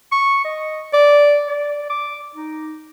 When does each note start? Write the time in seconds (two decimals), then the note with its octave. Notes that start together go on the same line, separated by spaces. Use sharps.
0.12 C#6
0.45 D#5
0.93 D5
1.48 D5
1.90 D6
2.35 D#4